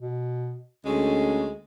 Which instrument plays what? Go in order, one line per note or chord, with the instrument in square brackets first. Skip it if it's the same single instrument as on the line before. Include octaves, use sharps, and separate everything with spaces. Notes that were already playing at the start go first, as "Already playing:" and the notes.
[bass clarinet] B2
[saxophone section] D2 G#3 [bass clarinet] C#4